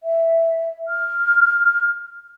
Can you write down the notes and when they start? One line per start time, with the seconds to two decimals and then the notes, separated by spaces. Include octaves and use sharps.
0.03 E5
0.88 F6